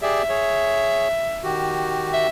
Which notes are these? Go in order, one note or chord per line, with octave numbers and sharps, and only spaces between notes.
G4 G#4 D5 E5
G#4 C#5
D#3 F#4 G4
E5